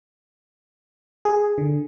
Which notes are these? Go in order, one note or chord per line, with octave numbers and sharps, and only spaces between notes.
G#4
D3